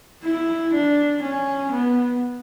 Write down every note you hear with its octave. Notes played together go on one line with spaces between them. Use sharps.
E4
D4
C#4
B3